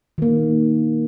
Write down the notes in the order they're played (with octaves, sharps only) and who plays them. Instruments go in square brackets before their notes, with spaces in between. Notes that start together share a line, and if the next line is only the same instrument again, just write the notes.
[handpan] D#3 A#3